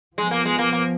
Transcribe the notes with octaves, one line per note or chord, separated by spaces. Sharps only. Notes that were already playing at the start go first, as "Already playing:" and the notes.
F3 G#3 B3
A#3
G#3
A#3
A#3